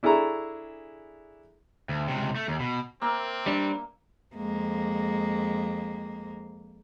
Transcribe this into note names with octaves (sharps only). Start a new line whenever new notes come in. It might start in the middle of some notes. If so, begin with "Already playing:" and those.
D4 E4 G#4 A4 A#5 C#6
D2
C#2 C3
A3
D#2
B2
A#3 C4 E5
G3 D4
F2 G#3 A#3